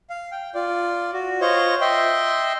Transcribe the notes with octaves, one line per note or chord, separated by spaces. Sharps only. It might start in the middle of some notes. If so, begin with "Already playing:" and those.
F5
G5
F4 D5
F#4
F4 C5 C#5 D#5 C#6
D#5 E5 G5 C6